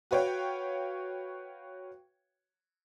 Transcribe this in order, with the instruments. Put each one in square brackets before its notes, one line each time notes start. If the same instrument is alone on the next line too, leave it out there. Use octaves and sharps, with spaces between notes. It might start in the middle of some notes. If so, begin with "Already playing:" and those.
[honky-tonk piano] F#4 B4 C#5 F5 G5